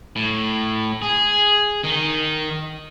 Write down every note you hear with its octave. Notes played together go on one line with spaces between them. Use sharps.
A2
G#4
D#3 D#4